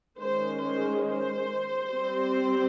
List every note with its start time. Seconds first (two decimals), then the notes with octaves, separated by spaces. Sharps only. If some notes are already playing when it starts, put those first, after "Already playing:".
0.20 D#3 G#3 C#4 C5
0.62 C5
1.04 C5
1.87 G3 C4